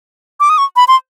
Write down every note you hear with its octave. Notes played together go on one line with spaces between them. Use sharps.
D6
D#6
C#6
B5
C6